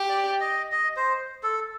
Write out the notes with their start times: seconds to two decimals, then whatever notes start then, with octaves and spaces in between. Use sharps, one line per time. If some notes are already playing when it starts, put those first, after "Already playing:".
Already playing: G4
0.09 D5
0.40 D#5
0.72 D#5
0.96 C5
1.43 A4